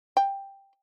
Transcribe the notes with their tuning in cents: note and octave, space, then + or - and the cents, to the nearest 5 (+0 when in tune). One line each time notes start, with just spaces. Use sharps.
G5 +5